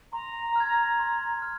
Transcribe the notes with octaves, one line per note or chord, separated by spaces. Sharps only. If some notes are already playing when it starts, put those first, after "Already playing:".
A#5 C6
F6 G#6
C6
F6